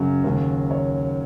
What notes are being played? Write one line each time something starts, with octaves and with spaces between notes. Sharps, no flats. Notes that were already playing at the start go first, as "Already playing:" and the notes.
Already playing: F#2 C#3 F#3
D#2 C#3 F#3
C#5